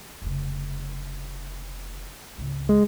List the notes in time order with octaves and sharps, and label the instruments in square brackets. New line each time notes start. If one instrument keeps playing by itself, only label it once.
[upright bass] F1 C#3
G#1 C#2
[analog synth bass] G#3